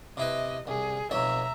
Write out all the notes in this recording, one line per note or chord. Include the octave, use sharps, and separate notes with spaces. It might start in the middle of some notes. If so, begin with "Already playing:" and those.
C3 E4 B4 D#5
C2 G#4
B1 F2 C#5 E5 A#5